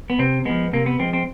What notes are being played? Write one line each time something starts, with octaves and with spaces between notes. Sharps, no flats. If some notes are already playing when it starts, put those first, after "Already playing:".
B3
C3 C4
F3 G#3 B3
C3 A#3
B3
F3 G#3 C4
C4